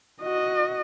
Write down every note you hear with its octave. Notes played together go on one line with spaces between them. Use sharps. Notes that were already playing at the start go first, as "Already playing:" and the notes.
F#4 D#5